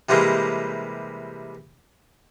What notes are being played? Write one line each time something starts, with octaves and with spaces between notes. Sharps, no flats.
C3 E3 G3 G#3 A#3